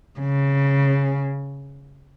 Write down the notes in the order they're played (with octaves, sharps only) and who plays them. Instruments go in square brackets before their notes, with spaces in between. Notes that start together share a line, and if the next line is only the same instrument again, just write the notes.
[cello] C#3